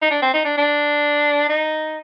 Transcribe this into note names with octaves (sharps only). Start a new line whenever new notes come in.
D#4
D4
C4
D#4
D4
D4
D#4